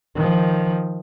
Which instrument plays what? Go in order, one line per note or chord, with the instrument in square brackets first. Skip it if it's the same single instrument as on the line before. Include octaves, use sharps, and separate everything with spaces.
[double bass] D#3 F3